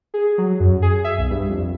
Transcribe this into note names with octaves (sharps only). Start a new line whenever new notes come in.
G#4
F#3
F#2
G#4
E5
B1
G2
F2